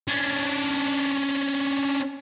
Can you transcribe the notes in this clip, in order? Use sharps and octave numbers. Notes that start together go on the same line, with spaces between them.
C#4 D4